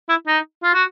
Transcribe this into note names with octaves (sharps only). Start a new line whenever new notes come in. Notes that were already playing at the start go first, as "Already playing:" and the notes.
E4
D#4
F4
F#4